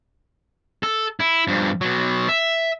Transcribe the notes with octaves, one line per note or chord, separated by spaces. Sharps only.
A4
E4
G2 F3
B2 F#3
E5